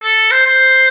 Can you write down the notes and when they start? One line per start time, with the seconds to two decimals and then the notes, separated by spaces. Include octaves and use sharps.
0.02 A4
0.31 C5
0.46 C5